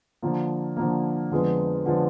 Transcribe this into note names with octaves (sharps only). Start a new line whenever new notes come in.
D3 F3 A#3
D3 F3 A#3
F2 D3 F3 G#3 B3
D3 F3 G#3 B3